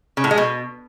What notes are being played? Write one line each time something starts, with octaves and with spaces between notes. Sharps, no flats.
C#3
A2
G#3
B2